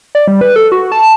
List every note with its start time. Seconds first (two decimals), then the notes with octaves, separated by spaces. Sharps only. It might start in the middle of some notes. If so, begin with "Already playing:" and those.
0.15 D5
0.27 G3
0.41 B4
0.56 A4
0.72 F#4
0.92 A5